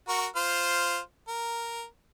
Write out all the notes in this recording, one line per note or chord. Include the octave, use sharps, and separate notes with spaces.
F#4 A#4 C#6
F4 C5 F6
A#4